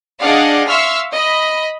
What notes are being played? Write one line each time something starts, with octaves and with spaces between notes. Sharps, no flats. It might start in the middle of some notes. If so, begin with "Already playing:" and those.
D4 G#4 D5 D#5 F5 F#5
E5 F5 C6 C#6 E6 F6
D#5 B5